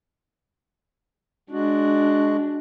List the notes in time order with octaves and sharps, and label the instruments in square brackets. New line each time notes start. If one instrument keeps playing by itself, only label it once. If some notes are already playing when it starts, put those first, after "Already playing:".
[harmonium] G#3 F#4 [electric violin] D4